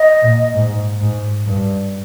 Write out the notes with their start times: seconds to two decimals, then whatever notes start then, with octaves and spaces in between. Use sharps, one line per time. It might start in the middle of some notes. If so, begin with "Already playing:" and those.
Already playing: D#5
0.23 A#2
0.54 G#2
1.01 G#2
1.47 G2